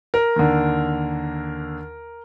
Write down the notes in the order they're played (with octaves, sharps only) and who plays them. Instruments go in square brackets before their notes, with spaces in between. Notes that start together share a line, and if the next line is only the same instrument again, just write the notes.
[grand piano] A#4
D#2 D3